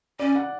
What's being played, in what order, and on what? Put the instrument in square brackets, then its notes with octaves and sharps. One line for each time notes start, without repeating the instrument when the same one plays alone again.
[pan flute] C#4 [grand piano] D5
[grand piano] F#5